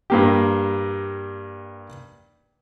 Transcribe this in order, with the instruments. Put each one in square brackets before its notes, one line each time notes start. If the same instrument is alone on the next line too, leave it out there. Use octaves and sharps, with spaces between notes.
[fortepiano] G2 A#3 G4